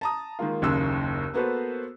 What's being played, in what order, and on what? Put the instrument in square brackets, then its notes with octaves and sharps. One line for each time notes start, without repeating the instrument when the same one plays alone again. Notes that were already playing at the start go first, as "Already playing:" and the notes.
[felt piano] A5 A#5 D#6
D#3 G#3 A#3 F4
F#1 D#2 C#3 C6 E6 F#6
A#3 B3 F#4 A4 B4 C5